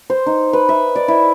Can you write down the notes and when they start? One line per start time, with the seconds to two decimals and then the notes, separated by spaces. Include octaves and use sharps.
0.10 C5
0.27 D#4
0.53 B4
0.69 E5
0.96 D5
1.08 E4